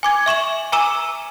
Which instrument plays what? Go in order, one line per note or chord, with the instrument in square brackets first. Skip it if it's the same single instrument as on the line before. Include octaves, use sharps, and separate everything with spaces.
[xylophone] G#5 D6 G#6
E5 C#6 E7 F#7
G#5 A#5 D6 E6 E7